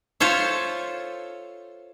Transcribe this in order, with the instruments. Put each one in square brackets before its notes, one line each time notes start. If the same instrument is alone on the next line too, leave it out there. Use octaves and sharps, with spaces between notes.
[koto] F4 A4 C5 C#5 E5